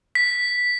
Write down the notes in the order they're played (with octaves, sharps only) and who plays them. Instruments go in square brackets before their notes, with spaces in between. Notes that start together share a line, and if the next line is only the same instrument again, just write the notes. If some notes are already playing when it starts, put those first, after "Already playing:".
[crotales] B6